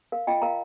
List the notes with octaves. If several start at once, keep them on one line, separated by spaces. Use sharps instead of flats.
A#4 F5
F4 D#5 G5
A#4 F5 A#5